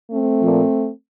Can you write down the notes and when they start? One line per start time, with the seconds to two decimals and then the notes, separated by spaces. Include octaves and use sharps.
0.11 A3 C4
0.40 A#2 F3